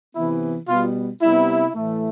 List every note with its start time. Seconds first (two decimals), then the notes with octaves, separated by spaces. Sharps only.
0.16 C3 E3 B3 E4
0.68 B2 G3 B3 F4
1.22 C3 G3 B3 E4
1.74 A2 E3 A3